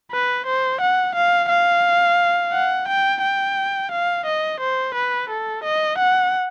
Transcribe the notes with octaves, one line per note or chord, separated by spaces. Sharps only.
B4
C5
F#5
F5
F5
F#5
G5
G5
F5
D#5
C5
B4
A4
D#5
F#5